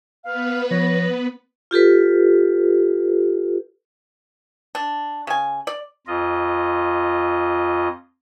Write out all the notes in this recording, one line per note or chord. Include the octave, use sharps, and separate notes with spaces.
B3 B4 F5
F3 C#5 A#6
F4 G4 A4 B4
D4
C#3 G#5
D5
F2 F4 D#5